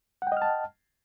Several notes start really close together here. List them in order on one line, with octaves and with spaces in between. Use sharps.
F#5 G5 D#5 F6 A5